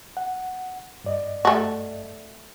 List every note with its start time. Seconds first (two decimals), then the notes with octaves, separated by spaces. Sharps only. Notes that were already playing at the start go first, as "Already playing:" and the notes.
0.17 F#5
1.04 G2 D5 D#5
1.45 A3 F#4